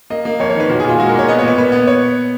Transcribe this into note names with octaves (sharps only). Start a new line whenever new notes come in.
A#3 D#5
A#3
F2 C#5
C#5
D#3 B4
A#2 F#4
G#4
A#2
F4
G#3 F#4
A#4
A#2 C#5
B3 D#5
C#5
A#2 B4
A#2 B4
B3
C#5